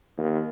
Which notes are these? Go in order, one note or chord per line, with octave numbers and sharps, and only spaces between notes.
D#2